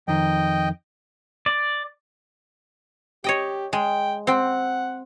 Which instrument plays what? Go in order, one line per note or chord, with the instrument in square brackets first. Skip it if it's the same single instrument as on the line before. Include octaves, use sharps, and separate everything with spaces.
[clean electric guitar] F2 D#3 [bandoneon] D#5 G5
[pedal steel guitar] D5
[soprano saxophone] G4 [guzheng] C#5 D#5 G5
[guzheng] G#3 [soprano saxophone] G5
[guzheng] C4 C5 G5 [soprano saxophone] F#5